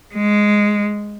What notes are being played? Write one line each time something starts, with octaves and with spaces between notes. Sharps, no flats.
G#3